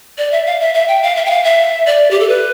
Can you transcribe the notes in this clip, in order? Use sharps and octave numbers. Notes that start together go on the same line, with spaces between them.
D5
E5
F5
E5
E5
G5
F5
E5
G5
F5
E5
D5
G4
A4
B4